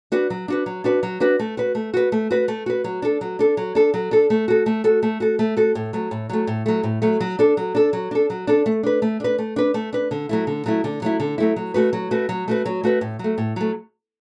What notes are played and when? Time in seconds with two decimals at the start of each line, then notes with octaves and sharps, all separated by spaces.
0.12 D4 F#4 B4
0.30 F#3
0.48 D4 F#4 B4
0.66 F#3
0.84 D4 F#4 B4
1.03 F#3
1.20 D4 F#4 B4
1.39 A3
1.57 F#4 B4
1.75 A3
1.94 F#4 B4
2.12 A3
2.30 F#4 B4
2.48 A3
2.66 F#4 B4
2.84 F#3
3.02 D4 A4
3.21 F#3
3.39 D4 A4
3.57 F#3
3.75 D4 A4
3.94 F#3
4.11 D4 A4
4.30 A3
4.48 F#4 A4
4.66 A3
4.84 F#4 A4
5.03 A3
5.20 F#4 A4
5.39 A3
5.57 F#4 A4
5.75 A2
5.93 F#3 A3
6.11 A2
6.29 F#3 A3
6.47 A2
6.66 F#3 A3
6.83 A2
7.02 F#3 A3
7.20 F#3
7.39 D4 A4
7.57 F#3
7.75 D4 A4
7.93 F#3
8.11 D4 A4
8.30 F#3
8.47 D4 A4
8.66 A3
8.83 D4 B4
9.02 A3
9.20 D4 B4
9.38 A3
9.56 D4 B4
9.74 A3
9.93 D4 B4
10.11 D3
10.29 F#3 A3 E4
10.47 D3
10.66 F#3 A3 E4
10.84 D3
11.02 F#3 A3 E4
11.20 D3
11.38 F#3 A3 E4
11.56 F#3
11.74 A3 F#4 B4
11.93 F#3
12.11 A3 F#4 B4
12.29 F#3
12.48 A3 F#4 B4
12.66 F#3
12.83 A3 F#4 B4
13.01 A2
13.19 F#3 A3
13.38 A2
13.56 F#3 A3